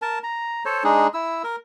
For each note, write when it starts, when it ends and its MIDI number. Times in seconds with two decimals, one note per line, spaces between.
0.02 0.19 70
0.02 0.19 81
0.23 0.64 82
0.65 0.84 69
0.65 0.84 72
0.65 0.84 73
0.84 1.07 56
0.84 1.07 62
0.84 1.07 63
0.84 1.07 68
1.14 1.42 64
1.14 1.42 88
1.44 1.56 70